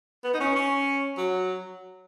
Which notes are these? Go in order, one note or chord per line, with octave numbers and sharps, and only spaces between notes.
B3
D#4
C#4
C#4
F#3